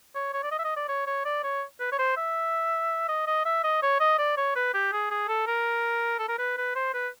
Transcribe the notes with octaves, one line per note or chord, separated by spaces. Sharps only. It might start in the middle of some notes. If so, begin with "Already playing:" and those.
C#5
C#5
D5
D#5
E5
D#5
D5
C#5
C#5
D5
C#5
B4
C#5
C5
E5
D#5
D#5
E5
D#5
C#5
D#5
D5
C#5
B4
G4
G#4
G#4
A4
A#4
A4
A#4
B4
B4
C5
B4